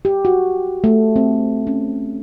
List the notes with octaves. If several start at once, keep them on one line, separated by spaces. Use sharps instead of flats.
G4
F#4
A3
C4
C#4